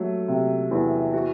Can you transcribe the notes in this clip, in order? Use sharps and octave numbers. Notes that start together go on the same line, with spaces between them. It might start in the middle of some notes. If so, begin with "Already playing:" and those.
Already playing: F#3 A3
C3
E2
F#4